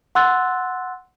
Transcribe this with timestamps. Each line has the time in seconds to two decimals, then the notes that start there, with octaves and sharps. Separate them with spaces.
0.15 F#5 C6 E6 F#6 A6